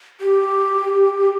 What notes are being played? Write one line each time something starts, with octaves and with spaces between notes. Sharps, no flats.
G4